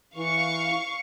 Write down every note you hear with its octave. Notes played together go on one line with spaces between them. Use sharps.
E3 F5 C#6